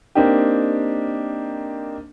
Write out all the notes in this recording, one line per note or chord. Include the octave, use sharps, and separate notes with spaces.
A#3 C4 D4 D#4 G4